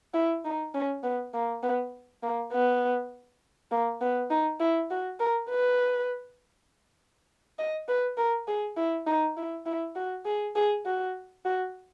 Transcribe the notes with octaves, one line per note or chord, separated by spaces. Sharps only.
E4
D#4
C#4
B3
A#3
B3
A#3
B3
A#3
B3
D#4
E4
F#4
A#4
B4
D#5
B4
A#4
G#4
E4
D#4
E4
E4
F#4
G#4
G#4
F#4
F#4